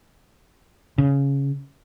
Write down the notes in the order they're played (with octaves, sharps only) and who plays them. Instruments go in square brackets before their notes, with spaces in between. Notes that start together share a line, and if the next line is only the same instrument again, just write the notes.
[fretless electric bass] C#3